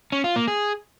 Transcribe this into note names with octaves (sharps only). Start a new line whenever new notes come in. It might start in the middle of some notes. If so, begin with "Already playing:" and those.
C#4
F4
A#3
G#4